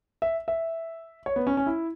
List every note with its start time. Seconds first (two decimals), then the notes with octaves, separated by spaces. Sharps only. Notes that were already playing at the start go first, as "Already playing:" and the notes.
0.22 E5
0.48 E5
1.26 C#5
1.36 B3
1.47 C#4
1.57 C#4
1.66 E4